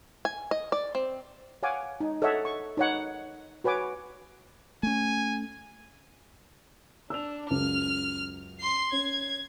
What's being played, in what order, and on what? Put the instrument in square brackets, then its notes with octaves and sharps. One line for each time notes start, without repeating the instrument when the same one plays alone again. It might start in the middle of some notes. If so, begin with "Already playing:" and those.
[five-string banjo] G#5
D#5
D5
C4
[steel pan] C#5 F5 F#5 G#5 D6
D#4
A4 C#5 D#5 E5 F#5
C#6
D#4 C#5 F#5
F#4 B4 C#5 G#5 D6
[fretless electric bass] A3 C#4 [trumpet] G#5
[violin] D4 [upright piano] E6 F7
[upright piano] C#2 F#2 [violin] F6
[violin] C6 C7
[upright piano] C#4 [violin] G#6